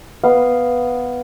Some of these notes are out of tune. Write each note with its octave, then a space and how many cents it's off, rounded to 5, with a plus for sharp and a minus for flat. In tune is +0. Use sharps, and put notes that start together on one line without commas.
B3 +0 F5 +0